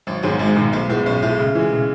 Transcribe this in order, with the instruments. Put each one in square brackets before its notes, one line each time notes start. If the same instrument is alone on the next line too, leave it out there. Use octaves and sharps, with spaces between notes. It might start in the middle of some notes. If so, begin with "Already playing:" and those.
[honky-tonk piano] G#1 [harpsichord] F#3
[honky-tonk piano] G#2 D#3 [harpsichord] F#3
[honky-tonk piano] G#1 [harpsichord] G#3
[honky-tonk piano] G#2 D#3
[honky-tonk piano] B1 [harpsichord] A3
[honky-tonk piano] A2 G#3 [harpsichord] B3
[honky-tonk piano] B1 [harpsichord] C#4
[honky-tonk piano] A2 G#3 [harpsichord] A3
[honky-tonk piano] C#3
E3 G#3
C#3